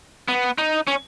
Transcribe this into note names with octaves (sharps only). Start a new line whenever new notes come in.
B3
D#4
C#4